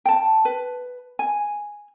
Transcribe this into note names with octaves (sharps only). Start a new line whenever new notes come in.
G5 A5
B4
G#5